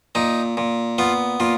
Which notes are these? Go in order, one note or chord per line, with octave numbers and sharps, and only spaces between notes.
A#2 D#4
A#2
B3 F4
A#2 F4